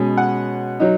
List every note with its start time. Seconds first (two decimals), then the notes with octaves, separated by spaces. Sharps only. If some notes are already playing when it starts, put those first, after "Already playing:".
Already playing: B2 G#3 C#4
0.17 F#5
0.80 F#3 D#4